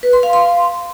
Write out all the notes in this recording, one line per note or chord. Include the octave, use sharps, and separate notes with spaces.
B4
C6
F5
C6